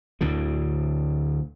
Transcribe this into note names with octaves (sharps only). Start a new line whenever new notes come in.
D2 A2 D3